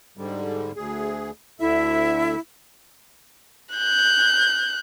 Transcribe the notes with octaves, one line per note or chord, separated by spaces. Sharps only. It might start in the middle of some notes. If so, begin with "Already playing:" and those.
G#2 D3 G3
D2 G#4
D2 D3 E4 E5
F#6 G6